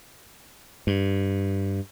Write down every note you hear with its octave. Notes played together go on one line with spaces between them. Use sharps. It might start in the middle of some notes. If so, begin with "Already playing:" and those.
G2